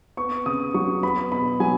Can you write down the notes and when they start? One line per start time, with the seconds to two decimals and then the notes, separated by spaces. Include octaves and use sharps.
0.17 B3 C#6
0.46 C#3 D#6
0.74 F#3 C#6
1.03 B3 B5
1.32 B2 B5
1.60 F#3 G#5